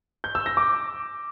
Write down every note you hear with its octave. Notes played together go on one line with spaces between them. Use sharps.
G6
E6
A#6
D6